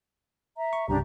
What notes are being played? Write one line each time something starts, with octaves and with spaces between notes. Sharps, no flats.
E5 A#5
C#6
C2 G2 C#3 D4 G4 A#5